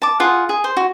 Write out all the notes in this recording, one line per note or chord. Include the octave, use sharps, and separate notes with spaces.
A5 D6
F4 G#4 F#5
G#4
C5
F#4